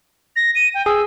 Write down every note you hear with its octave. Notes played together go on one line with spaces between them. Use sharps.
A#6
D#7
G5
G#4 E6